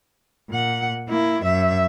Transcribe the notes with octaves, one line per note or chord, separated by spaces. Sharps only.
A#2 F#5
A#3 E4
F#2 E5